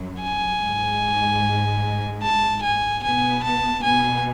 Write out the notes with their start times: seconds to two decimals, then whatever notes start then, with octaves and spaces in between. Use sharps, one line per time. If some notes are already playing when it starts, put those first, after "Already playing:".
Already playing: F#2 F#3
0.22 G#5
0.62 G#2 G#3
2.23 A5
2.63 G#5
3.03 B2 B3 G#5
3.44 A5
3.83 B2 B3 G#5